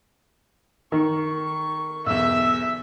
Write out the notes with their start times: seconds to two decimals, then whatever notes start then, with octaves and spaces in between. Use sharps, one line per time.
0.92 D#3 C#6
2.06 B1 E2 E5 E6